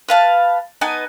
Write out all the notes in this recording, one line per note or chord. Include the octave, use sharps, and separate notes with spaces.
B4 F5 A5
B3 D#4 G#5 A5